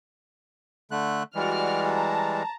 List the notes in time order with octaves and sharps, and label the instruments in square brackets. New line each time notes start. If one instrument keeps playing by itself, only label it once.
[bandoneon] D3 A3 F#6
[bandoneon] E3 G3 G#3 [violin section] F#4 D5 F6
[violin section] A5 A#5